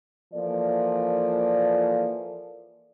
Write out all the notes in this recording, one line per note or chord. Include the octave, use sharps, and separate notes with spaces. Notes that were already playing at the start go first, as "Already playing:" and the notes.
E3 F3 A#3 A4 D5